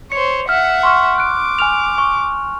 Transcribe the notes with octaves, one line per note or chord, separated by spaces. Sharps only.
C5 C#5 C#7
E5 F#5 F6
C6 C#6 F6
D6 F#6 D7
G#5 F6 F7
C#6